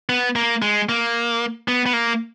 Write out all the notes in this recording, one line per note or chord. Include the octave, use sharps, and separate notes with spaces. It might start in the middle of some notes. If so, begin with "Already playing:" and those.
B3
A#3
G#3
A#3
B3
B3
A#3